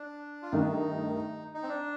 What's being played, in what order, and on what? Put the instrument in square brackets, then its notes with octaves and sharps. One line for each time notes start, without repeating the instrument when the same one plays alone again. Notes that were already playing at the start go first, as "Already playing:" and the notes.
Already playing: [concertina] D4
F4
[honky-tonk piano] G2 D#3 A3 [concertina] D#4
[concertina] D#4
C4
D4